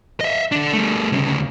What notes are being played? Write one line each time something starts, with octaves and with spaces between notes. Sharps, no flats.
D#5 E5
D4 A4
G3 A3
D2 C#3